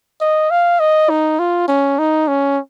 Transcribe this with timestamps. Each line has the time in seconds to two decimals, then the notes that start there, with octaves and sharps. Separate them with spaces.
0.21 D#5
0.50 F5
0.80 D#5
1.10 D#4
1.39 F4
1.68 C#4
1.99 D#4
2.28 C#4